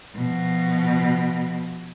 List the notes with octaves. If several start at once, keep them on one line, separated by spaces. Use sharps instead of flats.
B2 F3